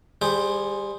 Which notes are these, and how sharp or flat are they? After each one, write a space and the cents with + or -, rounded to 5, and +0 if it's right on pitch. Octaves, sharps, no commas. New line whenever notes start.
G3 +25 G#4 +0 C5 +0